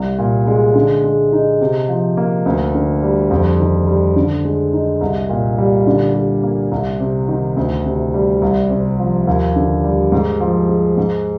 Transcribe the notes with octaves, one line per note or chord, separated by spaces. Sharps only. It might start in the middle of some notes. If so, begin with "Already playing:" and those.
Already playing: C2 G3
A#2
G#3
D3
G#3
D#4
C3
F3
A#3
D2
D3
G3
F2
D#3
G3
D3
G#3
D#4
C2
A#2
G3
D3
G3
A#3
C2
C3
D#3
D2
C3
G3
C2
C3
F3
D#2
D3
G3
G#2
F3
G#3
G#2